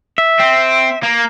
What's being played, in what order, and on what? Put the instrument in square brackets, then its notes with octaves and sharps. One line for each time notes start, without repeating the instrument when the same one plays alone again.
[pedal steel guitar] E5
[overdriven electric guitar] C4
A#3